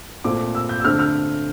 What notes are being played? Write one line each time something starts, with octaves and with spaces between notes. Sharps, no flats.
A#2 A3 C4 D6
E6
G6
E6
D3 A3 C4 F6
F6